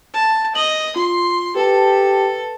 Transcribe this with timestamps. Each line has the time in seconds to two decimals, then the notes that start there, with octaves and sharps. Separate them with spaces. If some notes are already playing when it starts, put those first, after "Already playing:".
0.14 A5
0.55 D#5 F#7
0.96 F4 C6
1.56 G4 A4 B4 A5